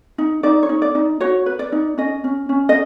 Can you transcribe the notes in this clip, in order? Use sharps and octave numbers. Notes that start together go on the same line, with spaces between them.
D#4
D#4 D5
C#5
D#4
D5
D#4
F#4 C#5
B4
D5
D#4
C#4 D#5
C#4
C#4
D#5